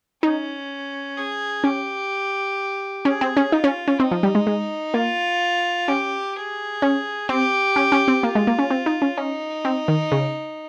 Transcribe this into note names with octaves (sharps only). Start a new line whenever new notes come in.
C#4 D#4
G#4
C#4 G4
C#4 G#4
C4
C#4
D#4 F4
C#4
C#4
C4 D#4
F3
G3
G#3
G#3
A#3 F4
C#4 G4
G#4
C#4
C4 G4
C#4
C#4
C4
A#3 F4
G#3
A#3
C#4
C4
D#4
C#4
C#4 D#4
C4
D#3
C#3